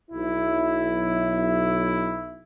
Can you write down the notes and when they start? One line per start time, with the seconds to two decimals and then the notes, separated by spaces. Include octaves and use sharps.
0.11 B1 E4